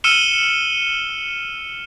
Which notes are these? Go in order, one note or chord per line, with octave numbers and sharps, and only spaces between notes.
E6 F6 C#7 D#7 E7 G7